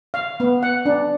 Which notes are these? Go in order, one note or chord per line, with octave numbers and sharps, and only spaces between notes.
F5
B3
F#5
D4